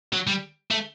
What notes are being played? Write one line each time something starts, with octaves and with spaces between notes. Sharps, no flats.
F#3
G3
A3